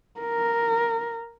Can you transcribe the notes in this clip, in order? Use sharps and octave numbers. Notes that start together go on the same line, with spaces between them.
A#4